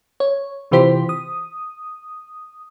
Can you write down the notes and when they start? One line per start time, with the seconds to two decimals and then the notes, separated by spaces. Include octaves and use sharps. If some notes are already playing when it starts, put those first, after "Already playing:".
0.20 C#5
0.71 C3 E3 F4 G4 C5 B6
1.09 D#6